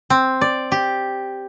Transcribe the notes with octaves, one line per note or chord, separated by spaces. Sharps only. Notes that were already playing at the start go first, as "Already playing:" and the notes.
C4
D5
G4